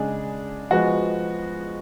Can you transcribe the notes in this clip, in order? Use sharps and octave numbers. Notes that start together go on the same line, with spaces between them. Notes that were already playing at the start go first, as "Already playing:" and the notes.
Already playing: C#3 G#3 D4 G#4
F3 G#3 B3 F#4